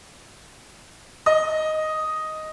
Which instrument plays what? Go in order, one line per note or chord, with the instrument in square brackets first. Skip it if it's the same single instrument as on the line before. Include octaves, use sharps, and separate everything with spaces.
[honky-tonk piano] D#5